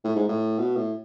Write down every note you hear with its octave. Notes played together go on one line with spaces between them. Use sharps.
A2
G#2
A2
B2
A2